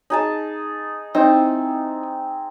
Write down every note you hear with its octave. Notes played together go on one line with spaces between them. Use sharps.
D#4 G#4 A5
C4 D#4 E4